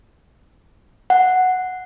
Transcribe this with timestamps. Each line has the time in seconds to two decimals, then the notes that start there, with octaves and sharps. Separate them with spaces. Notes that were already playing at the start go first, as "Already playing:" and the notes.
1.10 F#5